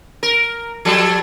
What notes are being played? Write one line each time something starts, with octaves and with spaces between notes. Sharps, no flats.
A#4
F3 G3 A4